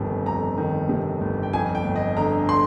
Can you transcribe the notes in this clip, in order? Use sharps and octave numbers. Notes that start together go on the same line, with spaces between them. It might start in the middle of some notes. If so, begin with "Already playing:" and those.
Already playing: G1 F2 C3 D#3
F2 A#5
D#3
C3
G1
G5
F2 G#5
G5
G1
D#5
D3 A#5
C6